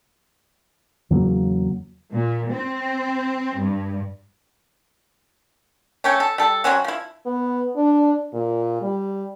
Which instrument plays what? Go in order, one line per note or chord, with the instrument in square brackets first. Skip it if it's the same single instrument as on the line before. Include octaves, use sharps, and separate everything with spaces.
[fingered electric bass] E2 C#3 F#3 A#3
[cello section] A#2
C4
G2
[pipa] A3 C#4 G5
A4
G3 A4
F#3 C4 C#4 F#4
F3 E4
[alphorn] B3
D4
A#2
G3